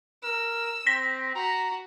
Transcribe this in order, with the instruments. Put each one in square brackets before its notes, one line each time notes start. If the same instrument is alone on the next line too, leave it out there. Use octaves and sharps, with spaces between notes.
[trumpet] A#4 [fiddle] E6
[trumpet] C4 [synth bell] A#6 B6
[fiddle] F#4 [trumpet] A#5